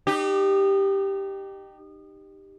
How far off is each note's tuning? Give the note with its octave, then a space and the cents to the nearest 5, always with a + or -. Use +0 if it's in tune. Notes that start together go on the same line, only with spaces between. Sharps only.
D#4 -30 G4 +0